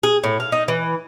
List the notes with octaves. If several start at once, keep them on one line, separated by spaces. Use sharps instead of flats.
G#4
A2
F5
D#4
E3